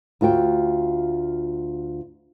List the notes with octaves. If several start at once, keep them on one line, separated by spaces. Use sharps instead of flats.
D2 F4 F#4 G5